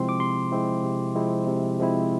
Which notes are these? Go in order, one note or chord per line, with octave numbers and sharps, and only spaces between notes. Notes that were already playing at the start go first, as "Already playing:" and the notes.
Already playing: C3 F3 G#3 C4 E4 C6
D6
C3 C6
F3 G#3 C4 E4
C3
F3 G#3 C4 E4
C3
F3 G#3 C4 E4